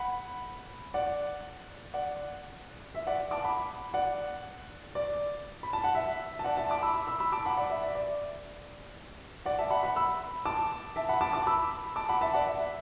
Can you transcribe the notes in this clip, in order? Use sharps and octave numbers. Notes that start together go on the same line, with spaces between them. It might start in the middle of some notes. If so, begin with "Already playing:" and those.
Already playing: F#5 B5
D5 F#5
D5 F#5
E5
D5 F#5
A5 D6
F#5 B5
D5 F#5
D5
B5
A5
F#5
E5
A5
D5 F#5
E5 A5
A5 D6
B5 E6
B5 E6
B5 E6
A5 D6
F#5 B5
D5 F#5
E5
D5
D5
D5 F#5
E5 A5
F#5 B5
F#5 B5
B5 E6
A5 D6
E5 A5
F#5 B5
A5 D6
A5 D6
B5 E6
A5 D6
F#5 B5
E5 A5
D5 F#5
E5